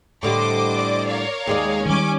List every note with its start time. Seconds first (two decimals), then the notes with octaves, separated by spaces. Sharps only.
0.23 A2 D3 G3 C5 D#5 D6
0.75 D5
1.07 A#4 C#5 F5
1.47 D#2 G#3 G#4 D5
1.86 D#3 G3 C#4 G#5 D6